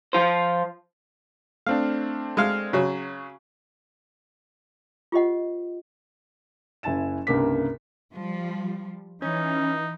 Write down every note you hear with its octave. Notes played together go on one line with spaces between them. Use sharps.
F3 F4 C5
A3 C4 D4 F5
G#3 F5 F6
C#3 F#3
F4 G4 C5 D#5 F#5
F#1 E4 G#5 A6 E7
C2 G2 C#3 A#3 D6 B6
F3 G3
E3 C#4 D#4